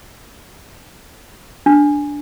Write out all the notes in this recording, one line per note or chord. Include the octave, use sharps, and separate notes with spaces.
D4